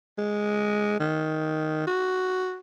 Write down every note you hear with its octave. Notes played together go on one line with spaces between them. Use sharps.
G#3
D#3
F#4